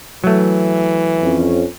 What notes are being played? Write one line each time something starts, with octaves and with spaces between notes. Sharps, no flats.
E3 F#3 A3
F2 C#4